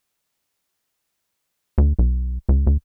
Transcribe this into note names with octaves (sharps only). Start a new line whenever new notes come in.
D2
B1
C#2
D2